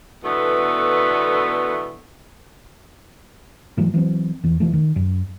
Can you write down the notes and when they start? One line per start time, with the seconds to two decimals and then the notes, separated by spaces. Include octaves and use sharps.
0.24 B2 D3 E3 A3 B3
3.77 G#2 E3 F#3 A3
3.94 E3 F#3 C4
4.43 E2 E3
4.60 D#2 E3 F3 A3
4.73 D#3
4.96 F#2